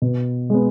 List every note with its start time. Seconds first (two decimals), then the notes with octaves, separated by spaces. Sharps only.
0.02 B2
0.50 G#3 B3